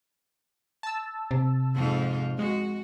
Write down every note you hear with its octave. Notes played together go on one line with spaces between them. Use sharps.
A5 E6
C3
F2 G#2 F4
G#3 F#4